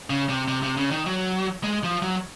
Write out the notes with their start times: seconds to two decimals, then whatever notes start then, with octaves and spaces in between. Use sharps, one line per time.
0.10 C#3
0.29 C3
0.48 C3
0.63 C3
0.77 C#3
0.91 D#3
1.06 F#3
1.64 G#3
1.84 F3
2.02 F#3